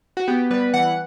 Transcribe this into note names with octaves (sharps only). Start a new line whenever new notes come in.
F#4
B3 G4
G3 B4
E3 F#5